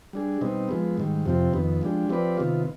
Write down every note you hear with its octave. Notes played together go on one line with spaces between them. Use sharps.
G3 D4 G#4
B2 G3 C4 D#4
F3 G#3 B3
G#2 D#3 G3
F2 C3 F3 C4 G4
F2 D#3 B3
F3 G#3 D4 G4
F3 C4 G4 B4 D5
C3 D#3 B3 F4